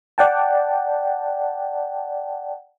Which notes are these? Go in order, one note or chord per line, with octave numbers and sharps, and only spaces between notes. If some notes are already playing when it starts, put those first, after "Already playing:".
D5 F#5 G5 A5